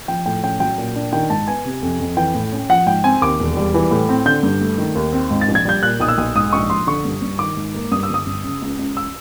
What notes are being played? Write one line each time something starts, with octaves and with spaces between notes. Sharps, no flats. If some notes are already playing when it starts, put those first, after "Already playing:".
F3 G5
A2 G5
C#4 G5
F#3 G5
A#2
D4
D#3 G5
G#2 A5
B3 G#5
C3
F2
F2
E3 G5
A2
C#4
F3 F#5
G#2 G5
C4 G#5
D#2 D6
E1
G3
E3
A2
C4
D3 G6
G2
A3
D#3
D#2
C4
G#2
A6
A#1
G#6
G3 G6
A#2 F#6
B1 D#6
E6
B1
G#2 D#6
A#1 C#6
A#1 C6
D3 C#6
G2
G2
D#3 D6
G#2
A#3
G2 D#6
E6
G1 D#6
G1
C#3
C#2
C#2
E6